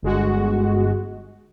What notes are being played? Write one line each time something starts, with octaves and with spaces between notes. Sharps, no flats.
G1 G#3 F#4